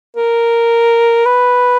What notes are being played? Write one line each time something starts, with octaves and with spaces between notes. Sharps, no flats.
A#4
B4